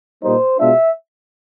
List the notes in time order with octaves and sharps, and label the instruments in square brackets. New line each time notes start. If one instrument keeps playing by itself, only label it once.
[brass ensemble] A#2 G3 A#3 D#4 C5
B2 G#3 B3 D4 F4 E5